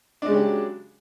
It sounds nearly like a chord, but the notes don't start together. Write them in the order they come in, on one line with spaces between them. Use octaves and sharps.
D4 G#3 C#3 G4 F#3